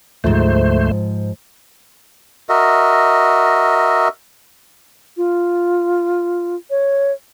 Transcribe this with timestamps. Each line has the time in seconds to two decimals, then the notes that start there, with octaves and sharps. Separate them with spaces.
0.24 D2 G#2 F3 A3 C5
2.49 F#4 A#4 D#5 E5
5.17 F4
6.70 C#5